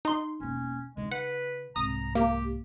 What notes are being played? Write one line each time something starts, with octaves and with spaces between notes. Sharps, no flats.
D#4 C6
E1 A#3 C#4
C#3 G#3 D#4
B4 F#5
C2 G#2 A#5 D#6
A#3 G4